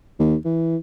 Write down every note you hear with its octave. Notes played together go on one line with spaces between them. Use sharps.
D#2
E3